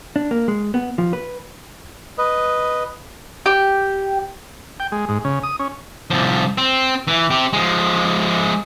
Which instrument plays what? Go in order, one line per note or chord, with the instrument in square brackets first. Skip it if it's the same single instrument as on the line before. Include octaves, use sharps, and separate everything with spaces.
[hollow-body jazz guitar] D4
A#3
G#3
B3
F3
B4
[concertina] B4 D#5
[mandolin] G4
[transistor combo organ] G5
G#3
G#2
C#3
D#6
C#4
[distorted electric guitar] C2 F3
C4
E3
C4 G4
F3 G#3